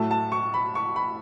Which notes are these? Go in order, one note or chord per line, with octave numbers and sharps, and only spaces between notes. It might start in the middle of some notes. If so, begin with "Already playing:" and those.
Already playing: A2 F#3 A3 A5
A5
C#6
B5
C#6
B5